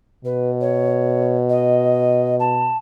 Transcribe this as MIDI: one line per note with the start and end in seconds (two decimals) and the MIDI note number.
0.24 2.76 47
0.24 0.50 71
0.60 1.36 73
1.49 2.35 75
2.39 2.76 81